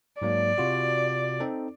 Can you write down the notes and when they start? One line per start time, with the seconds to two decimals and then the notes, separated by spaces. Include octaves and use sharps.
0.22 G#2 F#3 A#3 D5
0.58 C3 F4 F#4
1.40 C4 D#4 A4